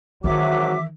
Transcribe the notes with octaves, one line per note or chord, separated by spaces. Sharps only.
G#1 D#3 E3 F#3 E5 D6